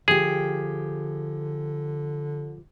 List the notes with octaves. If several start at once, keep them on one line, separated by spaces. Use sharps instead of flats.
D3 F3 G4 G#4